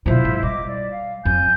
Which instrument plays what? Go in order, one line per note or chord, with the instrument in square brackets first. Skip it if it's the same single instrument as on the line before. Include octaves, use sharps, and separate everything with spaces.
[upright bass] B2 D3 [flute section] E4 F4 C5
[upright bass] G#2
[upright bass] G3 [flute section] D#5 D6
[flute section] D5
F5
[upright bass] F2 [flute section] G#5 G6